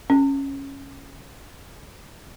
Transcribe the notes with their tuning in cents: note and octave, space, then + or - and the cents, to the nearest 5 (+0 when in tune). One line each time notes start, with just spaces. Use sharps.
C#4 -10